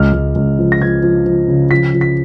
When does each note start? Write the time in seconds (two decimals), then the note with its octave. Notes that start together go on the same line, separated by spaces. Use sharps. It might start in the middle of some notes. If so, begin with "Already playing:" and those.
Already playing: C#2 F6
0.13 C#2
0.35 C#2
0.59 F3
0.72 A#6
0.81 F3 G#6
1.03 F3
1.26 F3
1.48 C#3
1.71 F3 B6
1.94 F3
2.01 B6